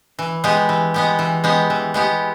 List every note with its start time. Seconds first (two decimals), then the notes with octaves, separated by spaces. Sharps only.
0.19 E3
0.44 G#3 B3 G4
0.69 E3
0.94 G#3 B3 G4
1.19 E3
1.44 G#3 B3 G4
1.70 E3
1.94 G#3 B3 G4